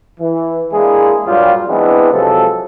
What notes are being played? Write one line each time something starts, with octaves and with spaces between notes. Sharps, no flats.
E3
G#3 A#3 D4 E4 G#4
G2 A#2 F#3 G3 F4 G4
E3 G#3 B3 C4 D4 E4
C3 F3 F#3 G#3 A4